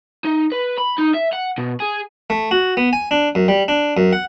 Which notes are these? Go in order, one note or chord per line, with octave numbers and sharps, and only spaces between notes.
D#4
B4
B5
D#4
E5
F#5
B2
G#4
A3
F#4
B3
G#5
D4
F#2
G3
D4
F#2
F#5